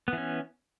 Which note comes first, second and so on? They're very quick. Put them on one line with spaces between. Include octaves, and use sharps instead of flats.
B3 E3 C#4